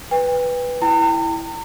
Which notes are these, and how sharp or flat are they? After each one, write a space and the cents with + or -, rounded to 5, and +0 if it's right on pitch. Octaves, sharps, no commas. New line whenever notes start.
B4 +0 G5 +40
E4 +0 G5 +0 A#5 -40